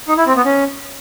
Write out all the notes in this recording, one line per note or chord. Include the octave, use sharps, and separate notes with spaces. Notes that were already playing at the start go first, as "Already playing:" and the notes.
D#4
E4
C4
B3
C#4